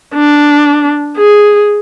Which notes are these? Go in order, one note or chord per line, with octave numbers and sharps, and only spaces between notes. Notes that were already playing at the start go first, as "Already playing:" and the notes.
D4
G#4